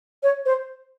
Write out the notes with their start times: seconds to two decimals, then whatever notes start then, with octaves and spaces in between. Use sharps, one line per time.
0.23 C#5
0.46 C5